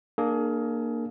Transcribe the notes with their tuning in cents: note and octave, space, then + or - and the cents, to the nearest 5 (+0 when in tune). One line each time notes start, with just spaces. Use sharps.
A#3 +0 D4 +30 G#4 +30